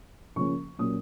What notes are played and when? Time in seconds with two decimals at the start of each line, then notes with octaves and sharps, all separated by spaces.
0.36 C#3 F3 A#3 C#4 C#6
0.78 A#2 F#3 A#3 C#4 D#6